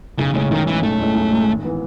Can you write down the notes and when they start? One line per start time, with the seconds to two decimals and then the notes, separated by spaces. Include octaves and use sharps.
0.19 B1 C#3
0.35 A2 C#3 G#3 C#4
0.51 B1 D#3
0.67 A2 E3 G#3 C#4
0.82 B1 A3
1.00 A2 G#3 C#4
1.15 B1
1.31 A2 G#3 C#4
1.48 G#1
1.63 E3 B3